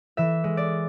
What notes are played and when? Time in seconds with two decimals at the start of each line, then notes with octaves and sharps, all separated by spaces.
0.17 E3 E5
0.44 G#3
0.57 D5